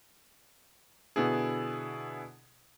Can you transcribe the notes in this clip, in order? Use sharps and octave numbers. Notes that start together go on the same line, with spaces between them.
B2 D3 B3 E4 G#4